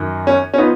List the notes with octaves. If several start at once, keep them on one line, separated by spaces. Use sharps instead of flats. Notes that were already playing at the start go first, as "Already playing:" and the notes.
Already playing: F#2 D#3
C#4
C#4
F3 B3 D#4